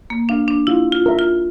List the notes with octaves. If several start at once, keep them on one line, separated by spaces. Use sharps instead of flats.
A#3
D4 A#4 F5
D4
E4 F4
F4
A#4 E5
F4